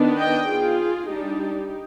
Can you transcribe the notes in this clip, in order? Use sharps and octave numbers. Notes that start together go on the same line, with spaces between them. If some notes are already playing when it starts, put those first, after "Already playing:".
Already playing: D#3 B3 D4
D#5 G5
F4 G#4
G3 D4 D#4 G4